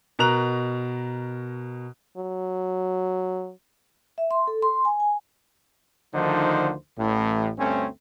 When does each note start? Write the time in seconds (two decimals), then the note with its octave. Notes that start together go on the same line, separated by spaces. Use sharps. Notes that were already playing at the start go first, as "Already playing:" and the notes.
0.19 B2 A#4 A#5 F#6 F7
2.17 F#3
4.18 E5
4.31 C6
4.47 A4
4.62 C6
4.85 G#5
5.00 G#5
6.14 D2 D3 D#3 F3 D#4 C5
6.98 A1 A2
7.58 D2 G2 A3 C4 C#4